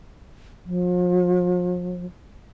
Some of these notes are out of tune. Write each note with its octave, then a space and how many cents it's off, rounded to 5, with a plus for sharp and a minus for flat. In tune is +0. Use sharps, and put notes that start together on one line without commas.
F3 +40